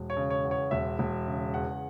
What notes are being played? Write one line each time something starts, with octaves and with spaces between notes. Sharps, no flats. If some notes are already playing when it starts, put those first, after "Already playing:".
Already playing: E1
C#5
C#3
C#5
E2
C#5
E1 E5
E1
C#3
E2 F#5